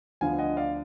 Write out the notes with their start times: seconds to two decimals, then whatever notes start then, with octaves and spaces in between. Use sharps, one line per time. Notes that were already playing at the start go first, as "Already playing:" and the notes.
0.21 D2 D3 F3 B3 D4 F5 G#5
0.39 D#5 F#5
0.57 D5 F5